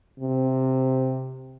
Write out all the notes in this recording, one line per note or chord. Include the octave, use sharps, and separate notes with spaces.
C3